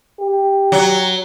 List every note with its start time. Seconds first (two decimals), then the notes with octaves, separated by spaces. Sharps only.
0.20 G4
0.72 F#3